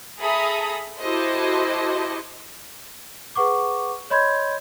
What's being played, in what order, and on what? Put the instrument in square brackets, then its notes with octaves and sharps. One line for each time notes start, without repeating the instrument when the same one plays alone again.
[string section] G#4 A4 E5 A#5 B5 D#6
E4 F#4 G4 A4 C5 D#5
[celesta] G#4 B4 F#5 C#6 D6
C#5 D#5 B5 C6 G6 G#6